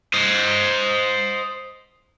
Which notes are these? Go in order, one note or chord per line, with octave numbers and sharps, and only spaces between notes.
C5 D#5